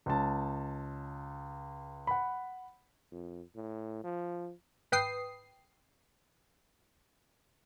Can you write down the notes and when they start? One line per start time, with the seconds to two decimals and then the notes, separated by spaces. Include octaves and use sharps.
0.06 C#2 C#4 A5
2.07 F#5 B5
3.11 F2
3.56 A2
4.04 F3
4.92 G#1 B4 G5 D#6 C7